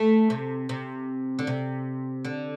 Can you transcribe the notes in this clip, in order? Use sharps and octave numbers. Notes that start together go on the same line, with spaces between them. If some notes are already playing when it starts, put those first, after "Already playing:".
Already playing: A3
C3
C3
D3
C3
D3